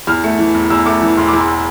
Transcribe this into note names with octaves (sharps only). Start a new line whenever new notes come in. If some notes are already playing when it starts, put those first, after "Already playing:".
E2 F6
A3
E3
E1
E2 E6
A3 D6
E3
E1 C6
E2 D6
C6